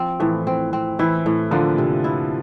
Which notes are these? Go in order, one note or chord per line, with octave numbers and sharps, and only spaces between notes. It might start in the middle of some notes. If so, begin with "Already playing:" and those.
Already playing: F3 C4
A2 E3
C4
C4
E3 E4
A2
D3 F3 A#3
C3
E4